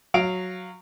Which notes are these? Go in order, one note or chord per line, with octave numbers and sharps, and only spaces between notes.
F#3 F5 D7 F7